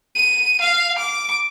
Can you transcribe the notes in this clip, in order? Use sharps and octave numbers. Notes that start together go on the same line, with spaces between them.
D#7
F5
D6